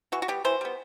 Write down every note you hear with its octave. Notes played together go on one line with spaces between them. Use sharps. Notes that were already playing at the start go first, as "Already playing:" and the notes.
E3 F#4
F#4
G3 B3 G4
E3 C5
G3 B3